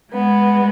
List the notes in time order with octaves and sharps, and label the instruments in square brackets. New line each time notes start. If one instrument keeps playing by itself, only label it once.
[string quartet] G#3 B3